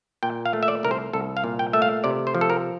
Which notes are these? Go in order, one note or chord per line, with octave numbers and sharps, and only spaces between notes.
A#2 G5
F5
A3
E5
D5
C2 A#4
C5
C2 A4
F5
A#2
G5
A3 E5
F5
C3 D5
C5
F3
A4
A#4